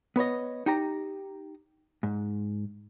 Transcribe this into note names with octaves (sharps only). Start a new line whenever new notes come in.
B3 B4 C#5 D#5
D#4 G4 A#5
G#2